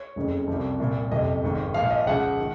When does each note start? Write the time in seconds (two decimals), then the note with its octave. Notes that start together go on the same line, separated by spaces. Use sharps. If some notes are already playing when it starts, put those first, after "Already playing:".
Already playing: C#5
0.16 F#1 F2 C#3
0.48 C2 C3 F3
0.79 C2 A#2 F3
1.11 F#1 F2 C3 D#5
1.43 G#1 G#2 D#3
1.74 A#1 A#2 F3 F5
1.90 D#5
2.07 C#2 C#3 F3 F#5
2.39 D#3